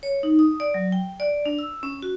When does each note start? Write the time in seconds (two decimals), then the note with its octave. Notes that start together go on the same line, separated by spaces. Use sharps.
0.03 C#5
0.23 D#4
0.39 D#6
0.60 D5
0.74 F#3
0.92 G5
1.20 D5
1.46 D4
1.59 E6
1.83 C#4
2.02 F#4